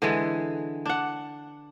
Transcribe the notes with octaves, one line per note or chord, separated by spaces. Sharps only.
D3 E3 G#3
D4 F#5